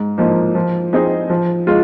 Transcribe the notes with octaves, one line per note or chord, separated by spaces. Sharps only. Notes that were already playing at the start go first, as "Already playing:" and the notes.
Already playing: G#2
F3 A#3 D#4
F3
C4 D#4 G#4 D#5
F3
G#3 F4